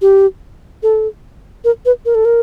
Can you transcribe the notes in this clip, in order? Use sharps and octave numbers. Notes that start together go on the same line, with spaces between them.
G4
A4
A#4
B4
A#4
A4
A#4